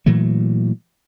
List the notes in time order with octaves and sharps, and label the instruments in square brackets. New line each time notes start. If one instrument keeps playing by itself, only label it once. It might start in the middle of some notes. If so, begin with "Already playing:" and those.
[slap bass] A#2 E3 F#3 A3